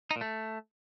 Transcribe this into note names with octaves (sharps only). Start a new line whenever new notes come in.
D#4
A#2
A3